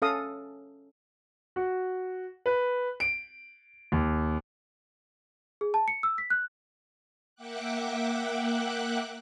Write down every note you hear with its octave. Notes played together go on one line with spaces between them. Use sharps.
C#4 A4 F5 D#6
F#4
B4
D7
D#2
G#4
A5
C#7
E6
B6
F#6
A#3 E5 F#5 G5 D6 F#6